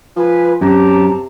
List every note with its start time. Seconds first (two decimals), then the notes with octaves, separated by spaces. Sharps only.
0.16 F3 B4 G#5
0.61 F#2 C3 C#4 F#4 G4 A5 A#5